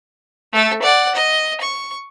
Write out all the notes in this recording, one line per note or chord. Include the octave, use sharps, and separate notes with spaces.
A3 A4
D5 F#5
D#5
C#6